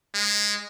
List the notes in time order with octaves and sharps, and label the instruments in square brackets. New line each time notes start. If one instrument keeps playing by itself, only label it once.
[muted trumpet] G#3